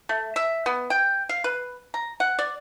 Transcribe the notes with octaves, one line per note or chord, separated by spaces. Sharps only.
A3
E5
B3
G5
F5
B4
A#5
F#5
D5